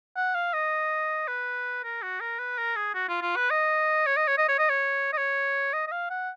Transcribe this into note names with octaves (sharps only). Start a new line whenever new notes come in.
F#5
F5
D#5
B4
A#4
F#4
A#4
B4
A#4
G#4
F#4
F4
F4
B4
D#5
C#5
D#5
C#5
D#5
C#5
D#5
C#5
D#5
C#5
D#5
D#5
F5
F#5